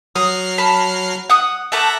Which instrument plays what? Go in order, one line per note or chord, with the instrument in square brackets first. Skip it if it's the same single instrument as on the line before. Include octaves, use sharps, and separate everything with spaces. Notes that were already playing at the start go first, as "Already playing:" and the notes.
[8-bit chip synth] F#3 F6 C7 [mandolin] D#6
[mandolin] A5 B5
F#5 D#6
[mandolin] A3 A5 D6 [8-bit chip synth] E5 F#5 A#5